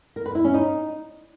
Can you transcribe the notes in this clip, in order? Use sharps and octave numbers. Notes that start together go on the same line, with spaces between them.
A#4
B4
E4
C#4
D#4